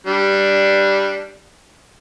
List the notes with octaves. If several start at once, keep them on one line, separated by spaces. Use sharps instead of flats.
G3 D4